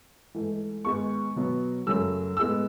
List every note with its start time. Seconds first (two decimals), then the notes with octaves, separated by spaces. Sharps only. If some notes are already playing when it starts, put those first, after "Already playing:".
0.34 G#2 E3 A3
0.85 G#2 D#3 G#3 B3 C#6
1.36 B2 F#3 B3
1.86 F#2 C#3 F#3 A3 E6
2.37 A2 G#3 B3 E6